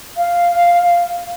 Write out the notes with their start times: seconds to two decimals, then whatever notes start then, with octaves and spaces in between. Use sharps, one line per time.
0.17 F5